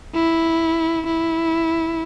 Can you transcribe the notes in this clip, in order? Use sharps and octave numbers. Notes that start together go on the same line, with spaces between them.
E4
E4